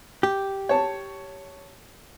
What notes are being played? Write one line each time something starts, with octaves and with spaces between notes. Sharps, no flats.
G4
C#5 A5